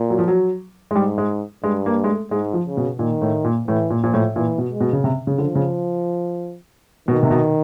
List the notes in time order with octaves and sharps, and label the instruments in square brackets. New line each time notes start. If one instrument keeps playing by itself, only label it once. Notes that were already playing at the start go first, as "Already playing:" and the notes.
Already playing: [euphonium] A#2
[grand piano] F#3
F3
F#3
G#3
[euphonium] G#2 [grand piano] G3
[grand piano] G#3
[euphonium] G2 [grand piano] G#3
[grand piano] A#3
G#3
A3
[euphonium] G#2 [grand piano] G#3
[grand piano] F3
[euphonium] C#3
[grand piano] B2
[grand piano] A#2 [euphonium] D#3
[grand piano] A2
A#2
[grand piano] A2 [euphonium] E3
[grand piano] A#2
[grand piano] A#2 [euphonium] F3
[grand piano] A2
[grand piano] A#2 [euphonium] E3
[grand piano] B2
[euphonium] G#3
[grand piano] B2
C#3
C3
C#3
[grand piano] D3 [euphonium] F3
[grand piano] C#3
[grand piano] B2 [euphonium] D#3
[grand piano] C3
B2